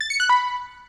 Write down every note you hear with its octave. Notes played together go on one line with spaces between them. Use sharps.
A6
C#7
F#6
B5